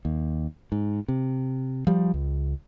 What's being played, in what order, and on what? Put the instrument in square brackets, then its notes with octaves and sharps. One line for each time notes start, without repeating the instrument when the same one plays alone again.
[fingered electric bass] D#2
G#2
C3
F3 G3
C#2